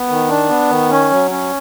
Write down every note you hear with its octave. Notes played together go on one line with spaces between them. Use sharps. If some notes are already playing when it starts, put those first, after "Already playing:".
Already playing: B3
D#3
D4
B3
D#3
C#4
F#3
C#4